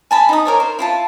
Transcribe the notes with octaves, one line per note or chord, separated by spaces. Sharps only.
G#5 A5 B5
D#4 D#6
A#4 C#5 D5
C5
E4 F4 A5